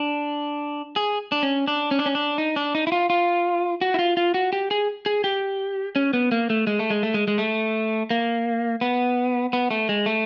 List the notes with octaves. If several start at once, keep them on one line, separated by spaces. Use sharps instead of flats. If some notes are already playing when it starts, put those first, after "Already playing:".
Already playing: D4
G#4
D4
C#4
D4
C#4
D4
C#4
D4
D#4
D4
D#4
E4
F4
F4
F#4
E4
F4
F4
F#4
G4
G#4
G#4
G4
C#4
B3
A#3
A3
G#3
A3
G#3
A3
G#3
G#3
A3
A#3
B3
B3
A3
G#3
A3